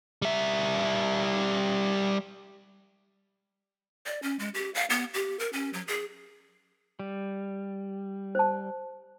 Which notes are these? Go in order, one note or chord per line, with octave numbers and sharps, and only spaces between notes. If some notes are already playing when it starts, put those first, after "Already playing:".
G3 E5
D5
C#4
G#3
G4
F5
B3
G4
A#4
C#4
F#3
G#4
G3
C5 A5